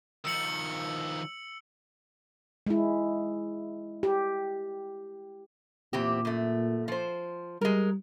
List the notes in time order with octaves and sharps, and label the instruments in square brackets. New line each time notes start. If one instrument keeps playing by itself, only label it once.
[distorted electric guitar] D#3 F3 [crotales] E6 C#7 F#7
[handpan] G#3 E4
G4
[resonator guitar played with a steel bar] E2 C4 G4 [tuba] A#2
[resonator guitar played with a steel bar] F#2 A3
F3 C5
[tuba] G3 [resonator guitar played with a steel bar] G#3 A#4